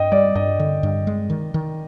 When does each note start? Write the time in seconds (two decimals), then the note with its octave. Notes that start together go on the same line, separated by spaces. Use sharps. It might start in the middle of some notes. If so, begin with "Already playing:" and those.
Already playing: G2 D#5 G5
0.12 G3 D5
0.35 G2 D#5
0.60 D3
0.83 G2
1.07 G#3
1.30 D#3
1.54 D#3